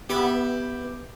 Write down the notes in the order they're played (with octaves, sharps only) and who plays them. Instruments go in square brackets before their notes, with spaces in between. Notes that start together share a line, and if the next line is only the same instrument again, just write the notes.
[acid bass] B3 [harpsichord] G4 E5 B5